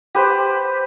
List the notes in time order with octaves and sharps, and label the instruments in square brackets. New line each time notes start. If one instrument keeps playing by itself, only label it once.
[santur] G4 B4 C5